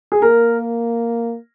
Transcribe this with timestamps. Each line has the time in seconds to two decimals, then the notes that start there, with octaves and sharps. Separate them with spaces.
0.12 G#4
0.22 A#3 A#4